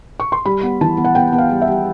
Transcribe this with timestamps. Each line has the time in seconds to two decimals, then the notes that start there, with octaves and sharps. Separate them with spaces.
0.20 C#6
0.32 C6
0.46 G3 B5
0.63 B3
0.81 E3 A5
0.97 B3
1.05 F#5
1.15 B3 G5
1.32 B3
1.38 F5
1.51 G3
1.62 E5
1.67 G3